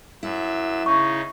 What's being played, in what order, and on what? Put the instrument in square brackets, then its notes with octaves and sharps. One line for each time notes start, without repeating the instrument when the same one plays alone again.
[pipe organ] F#2 E6 [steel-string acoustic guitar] E4
[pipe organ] C#3 D#4 [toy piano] C#6